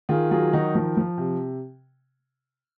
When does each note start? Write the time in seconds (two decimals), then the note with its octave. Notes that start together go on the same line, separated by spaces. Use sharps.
0.09 D#3 F4 G#4
0.31 F#3 F4 G#4
0.53 D#3 D#4 F#4
0.75 F3
0.97 F3
1.18 C3